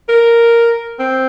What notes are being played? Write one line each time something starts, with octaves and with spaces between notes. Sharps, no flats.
A#4
C4